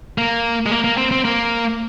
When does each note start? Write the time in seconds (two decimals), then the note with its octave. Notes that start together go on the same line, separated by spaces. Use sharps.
0.18 A#3
0.66 G#3
0.72 A#3
0.84 A#3
0.98 C4
1.11 C4
1.25 A#3